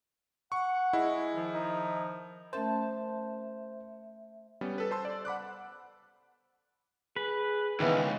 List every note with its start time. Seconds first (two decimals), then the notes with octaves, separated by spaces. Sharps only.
0.52 F#5 C#6
0.93 G#3 E4
1.34 D#3 F3
1.54 D#4
2.53 A3 C#4 A#4 C5 E5 A5
4.61 G3 B3 C#4
4.78 A4 B4
4.91 C5 A5 C6 E6
5.05 D5
5.25 F#5 B5 D6 F#6
7.16 G#4 B4
7.80 C#2 D#3 E3 B3